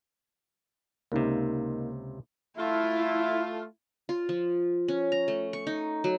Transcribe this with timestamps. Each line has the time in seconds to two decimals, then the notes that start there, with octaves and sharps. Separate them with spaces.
1.12 C#2 C3 A#3 D#4
2.59 A3 E4 F4
4.09 F4
4.29 F3
4.88 C#4
5.12 A#5
5.28 A3
5.53 C#6
5.67 D#4
6.04 F#3